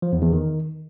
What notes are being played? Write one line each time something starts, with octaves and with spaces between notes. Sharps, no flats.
F3
E2
E2
D#3